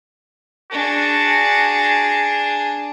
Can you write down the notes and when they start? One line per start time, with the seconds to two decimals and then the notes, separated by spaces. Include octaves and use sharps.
0.71 D4 F#4 G#4